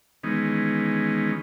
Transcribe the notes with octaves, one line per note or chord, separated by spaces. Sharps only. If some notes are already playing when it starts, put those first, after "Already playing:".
D#3 E3 G#3 B3 C#4 D#4